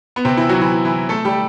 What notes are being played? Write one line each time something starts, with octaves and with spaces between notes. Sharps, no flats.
B3
C3 C4
E3 E4
F#3 F#4
E3 E4
E3 E4
A3 A4
G3 G4